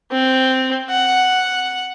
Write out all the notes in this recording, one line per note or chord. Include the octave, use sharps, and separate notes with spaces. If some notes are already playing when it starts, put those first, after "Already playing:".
C4
F#5